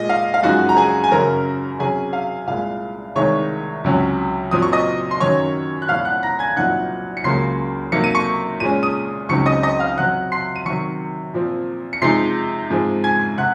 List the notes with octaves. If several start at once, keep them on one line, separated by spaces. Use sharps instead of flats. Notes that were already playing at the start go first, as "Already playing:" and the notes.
Already playing: A#2 G#3 D#5
F5
F5
F#2 F3 G#3 D#4 F#4 F#5
A#5
G#4 G#5
G#5
F#2 C#3 F#3 C#4 A#4 A#5
C3 F#3 C#4 G#4 G#5
F5
C2 A#2 G#3 F5
C2 C3 D#3 G#3 D#4 C#5 C#6
C#2 C3 F#3 C#4
A#2 F#3 C4 D#6
C#6
D#5 D#6
C6
F#2 D#3 F#3 C#4 C#5 C#6
F#6
C2 A#2 F3 F5 F6
F#5 F#6
A#5 A#6
G#5 G#6
C2 A#2 F#3 C4 D#4 F#5 F#6
C#7
C#2 C#3 F#3 A#3 C6 C7
C3 F#3 A#3 D#4 C#7
D#7
C#6 C#7
A#2 G#3 C#4 D#7
D#6 D#7
C#2 C#3 F#3 C4 D#4 C#6 C#7
D#5 D#6
D#5 D#6
F5 F6
C3 F#3 C4 F#5 F#6
C6 C7
D#7
C3 D#3 F#3 C#6 C#7
A#2 F3 C4
C#7
C3 F3 G#3 D#4 C6 C7
G#2 F3 G#3 C4
G#5 G#6
C3 F#5 F#6